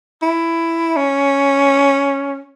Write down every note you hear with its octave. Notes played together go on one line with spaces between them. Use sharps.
E4
C#4